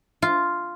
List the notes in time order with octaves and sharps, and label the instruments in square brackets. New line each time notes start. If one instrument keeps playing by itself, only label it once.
[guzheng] F4